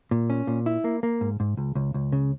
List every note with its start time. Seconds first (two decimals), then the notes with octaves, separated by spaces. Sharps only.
0.11 A#2
0.30 C#4
0.47 A#2
0.66 E4
0.84 A#3
1.03 A#3
1.21 G#2
1.40 G#2
1.57 C#2
1.75 C#2
1.94 C#2
2.12 C#3